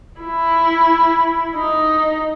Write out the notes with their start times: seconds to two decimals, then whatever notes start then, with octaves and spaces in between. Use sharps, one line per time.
0.21 E4
1.56 D#4